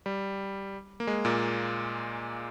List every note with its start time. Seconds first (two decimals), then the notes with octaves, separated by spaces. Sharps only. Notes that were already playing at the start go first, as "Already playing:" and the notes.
0.06 G3
1.00 A#3
1.07 G#3
1.25 A#2 A#3